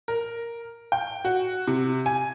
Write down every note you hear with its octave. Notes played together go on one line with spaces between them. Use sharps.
A#4
G5
F#4
C3
G#5